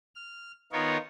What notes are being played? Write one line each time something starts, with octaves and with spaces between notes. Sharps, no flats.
F6
D#3 B3 D#4 F4 A#4 C#5